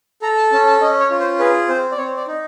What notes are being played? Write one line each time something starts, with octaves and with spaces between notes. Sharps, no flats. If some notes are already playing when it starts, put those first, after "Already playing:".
A4 A#5
A5
C#4 A5
A5
C#4 D#5
C#5
F4
C5
G#4 B4
C4 C5
D5
C4 C#5
D5
D#4